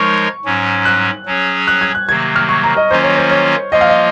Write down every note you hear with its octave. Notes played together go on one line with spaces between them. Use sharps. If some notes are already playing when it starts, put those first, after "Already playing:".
Already playing: F3 G#3 D#4 A#4 C#5 C#6
G#2 F#3 C#4
F#6
F#3 C#4 G#4 C#5
F#6
G#6
F#6
C3 D#3 F#3 A#3 G#6
F6
C#6
A#5
D#5
D#3 F#3 A#3 C#4 F4 C5
C#5
C5
C#5
F3 A#3 F4 D#5
F5
D#5